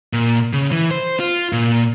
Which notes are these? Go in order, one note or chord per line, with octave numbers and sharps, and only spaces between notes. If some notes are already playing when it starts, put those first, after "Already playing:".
A#2
C#3
E3
C5
F4
A#2